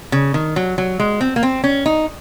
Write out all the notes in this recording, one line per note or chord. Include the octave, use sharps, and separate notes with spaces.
C#3
D#3
F#3
F#3
G#3
C4
A#3
C4
C#4
D#4